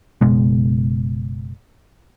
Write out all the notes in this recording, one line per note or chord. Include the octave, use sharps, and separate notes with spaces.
F#1 B2 G#3